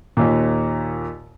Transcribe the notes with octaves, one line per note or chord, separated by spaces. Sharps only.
D#2 A#2